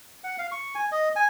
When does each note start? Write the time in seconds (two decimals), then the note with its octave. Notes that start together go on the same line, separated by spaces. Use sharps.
0.24 F#5
0.38 F5
0.52 C#6
0.75 G#5
0.92 D#5
1.16 G#5